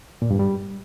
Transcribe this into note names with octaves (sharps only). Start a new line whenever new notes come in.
A#2
G2
G3